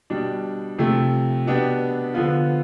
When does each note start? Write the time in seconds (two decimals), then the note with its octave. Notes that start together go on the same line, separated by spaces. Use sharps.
0.10 B2 G3 D4
0.78 C3 F3 A3
1.46 B2 B3 D4 G4
2.14 D3 F3 B3 F4